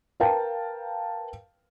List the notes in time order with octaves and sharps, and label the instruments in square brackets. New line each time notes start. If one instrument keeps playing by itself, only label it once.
[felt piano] A#4 B4 F5 G5 A5